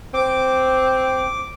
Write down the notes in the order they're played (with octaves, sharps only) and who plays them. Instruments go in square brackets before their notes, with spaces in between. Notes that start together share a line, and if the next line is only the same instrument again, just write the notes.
[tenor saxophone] C4 [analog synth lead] D6